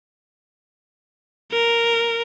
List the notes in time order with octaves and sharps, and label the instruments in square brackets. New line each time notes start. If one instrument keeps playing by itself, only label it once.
[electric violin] A#4